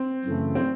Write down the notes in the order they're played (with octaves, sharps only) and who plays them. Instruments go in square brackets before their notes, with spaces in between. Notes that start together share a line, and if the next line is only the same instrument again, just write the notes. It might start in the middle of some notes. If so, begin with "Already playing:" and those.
Already playing: [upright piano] C4
[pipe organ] F#2 C#3 E3 A3
[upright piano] C4